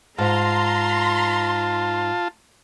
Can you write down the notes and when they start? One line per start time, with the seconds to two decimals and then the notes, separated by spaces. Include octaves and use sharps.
0.18 G#2 F4 A5 A#5 C6